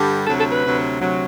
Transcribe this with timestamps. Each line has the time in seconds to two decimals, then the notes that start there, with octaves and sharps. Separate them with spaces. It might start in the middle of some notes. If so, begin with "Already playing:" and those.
Already playing: G2 D3 G3
0.27 D2 C3 F#3 A4
0.39 A4
0.51 B4
0.64 D2 C3 F#3
1.00 D2 C3 F#3